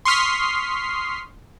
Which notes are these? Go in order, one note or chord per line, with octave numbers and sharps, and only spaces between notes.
C6 C#6 D#6 F6 B6 C7